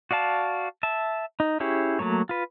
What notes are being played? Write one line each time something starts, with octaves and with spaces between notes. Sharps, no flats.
F#4 D5 F5 A5
E5 A5
D#4
C#4 E4 G4 G#4 C#5
F#3 A3 A#3 C#5
F4 B4